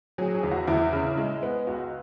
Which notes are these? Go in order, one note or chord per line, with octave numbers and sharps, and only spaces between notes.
F#3 G#4
G#4
E2
F#4
E2 E4
C#3
G#3
B3
C#2 F#4